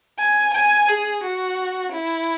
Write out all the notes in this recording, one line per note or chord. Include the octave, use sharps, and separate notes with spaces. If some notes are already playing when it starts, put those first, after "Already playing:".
G#5
G#5
G#4
F#4
E4